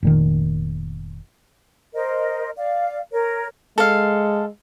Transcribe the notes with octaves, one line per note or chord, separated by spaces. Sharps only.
F1 A#2 D#3
A#4 C5 D#5
D5 F5
A#4 C#5
G#3 A4 F5